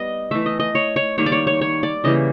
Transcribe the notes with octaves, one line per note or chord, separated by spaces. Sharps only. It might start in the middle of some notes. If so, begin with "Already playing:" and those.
Already playing: G3 B3 D#5
E3 A3 E5
D#5
D#5
C#5
C#5
D#3 G3 A#3 C#5
D5
C#5
C#5
C#5
D5
C#3 E3 G3 A#3 D#5